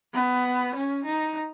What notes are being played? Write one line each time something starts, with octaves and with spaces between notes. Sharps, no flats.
B3
C#4
D#4